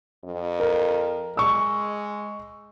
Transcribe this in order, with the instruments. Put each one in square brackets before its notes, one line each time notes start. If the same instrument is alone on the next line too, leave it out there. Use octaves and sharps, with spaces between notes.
[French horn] F2
[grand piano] A#4
[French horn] G#3 [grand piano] C#6 E6